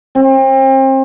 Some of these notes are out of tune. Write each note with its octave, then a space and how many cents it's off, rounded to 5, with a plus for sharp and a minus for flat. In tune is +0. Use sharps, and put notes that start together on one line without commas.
C4 +35